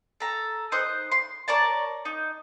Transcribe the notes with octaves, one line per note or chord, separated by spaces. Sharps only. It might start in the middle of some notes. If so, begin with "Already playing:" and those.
A4 A#5
D#4 C5 D#6 F#6
C6
A#4 C#5 D5 A5
D#4